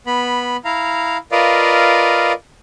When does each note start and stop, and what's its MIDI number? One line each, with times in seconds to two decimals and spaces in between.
0.07 0.57 59
0.07 0.57 83
0.65 1.17 64
0.65 1.17 77
0.65 1.17 82
1.32 2.32 65
1.32 2.32 70
1.32 2.32 71
1.32 2.32 74
1.32 2.32 75
1.32 2.32 77